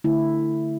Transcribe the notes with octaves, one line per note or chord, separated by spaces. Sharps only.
D3 A3 E4